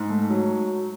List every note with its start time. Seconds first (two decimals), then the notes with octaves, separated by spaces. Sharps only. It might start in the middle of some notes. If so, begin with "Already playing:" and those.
Already playing: G#2
0.10 A3
0.30 F#3